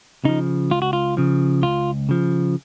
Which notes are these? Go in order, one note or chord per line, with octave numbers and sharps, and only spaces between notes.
C#3 F3 D#4
C#2 F4
F#4
F4
C#3 F3
C#2 F4
C#3 F3